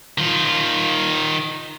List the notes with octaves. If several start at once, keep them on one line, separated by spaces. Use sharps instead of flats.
D#3 F4